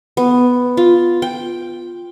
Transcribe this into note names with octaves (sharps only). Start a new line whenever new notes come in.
B3
F4
G5